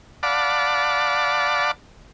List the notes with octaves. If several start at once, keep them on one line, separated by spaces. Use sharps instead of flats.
D5 F5 F#5 A5 B5 D6